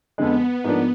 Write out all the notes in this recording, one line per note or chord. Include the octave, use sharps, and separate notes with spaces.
F2 D3 G#3 B3
G#2 F3 A#3 D4